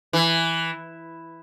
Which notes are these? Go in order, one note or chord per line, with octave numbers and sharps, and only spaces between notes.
E3